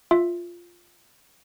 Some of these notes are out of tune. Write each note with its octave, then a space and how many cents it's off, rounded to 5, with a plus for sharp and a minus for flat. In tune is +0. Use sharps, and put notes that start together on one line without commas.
F4 +0 E5 +0